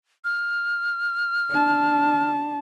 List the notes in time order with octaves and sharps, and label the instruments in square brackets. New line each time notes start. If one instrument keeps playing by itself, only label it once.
[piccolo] F6
[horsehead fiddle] D4 A5